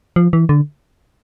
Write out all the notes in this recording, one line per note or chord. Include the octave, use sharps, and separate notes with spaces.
F3
E3
D3